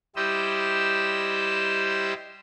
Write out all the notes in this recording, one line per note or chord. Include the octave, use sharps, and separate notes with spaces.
G3 E4 G4 C5 D#5 E6